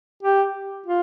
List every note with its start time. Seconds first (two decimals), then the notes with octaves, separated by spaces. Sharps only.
0.23 G4
0.86 F4